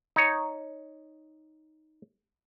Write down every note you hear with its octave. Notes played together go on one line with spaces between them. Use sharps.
D#4 C#5